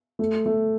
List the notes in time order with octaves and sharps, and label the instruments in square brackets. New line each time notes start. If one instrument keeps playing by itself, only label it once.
[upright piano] A3
A3